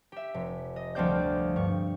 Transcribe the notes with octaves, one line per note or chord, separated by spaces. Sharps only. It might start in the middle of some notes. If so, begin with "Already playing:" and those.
G4 E5
F1
D#5
D2 F3 G3 C4 D5 G6
G2 C#6